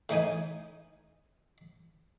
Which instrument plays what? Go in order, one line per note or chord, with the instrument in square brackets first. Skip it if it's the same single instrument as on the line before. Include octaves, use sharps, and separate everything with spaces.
[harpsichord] A2 E3 D#4 G#5